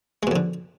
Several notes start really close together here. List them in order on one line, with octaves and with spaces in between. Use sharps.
G#3 B2 F2 D3